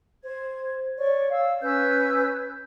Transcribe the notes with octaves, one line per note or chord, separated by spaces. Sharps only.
C5 G#6
C#5 D5 C#6
F5 E6
C#4 B4 E6 G6